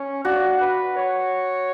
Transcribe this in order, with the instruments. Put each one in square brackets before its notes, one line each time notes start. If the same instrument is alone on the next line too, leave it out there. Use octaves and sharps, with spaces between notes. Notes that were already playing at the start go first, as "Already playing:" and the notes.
Already playing: [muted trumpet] C#4
[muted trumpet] D4 [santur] F#4
[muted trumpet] B4
C#5